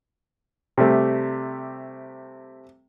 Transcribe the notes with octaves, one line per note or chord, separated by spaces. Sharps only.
C3 G3 A3